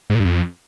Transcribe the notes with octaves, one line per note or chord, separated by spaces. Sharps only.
G#2
A#2
G2
F2